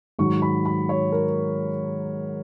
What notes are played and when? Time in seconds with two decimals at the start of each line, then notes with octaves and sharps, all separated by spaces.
0.19 G#2 D#3 F#3 C#6
0.42 B5
0.66 B5
0.89 C#5
1.12 A#4